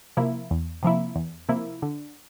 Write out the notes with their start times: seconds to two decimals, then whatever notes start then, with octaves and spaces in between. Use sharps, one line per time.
0.17 C3 F3 A#3 E4
0.51 E2
0.83 C3 F3 A#3 E4
1.16 E2
1.49 C3 F3 A#3 E4
1.82 D3